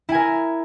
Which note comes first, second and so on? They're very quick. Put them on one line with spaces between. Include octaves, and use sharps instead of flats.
E4 G#5 A#4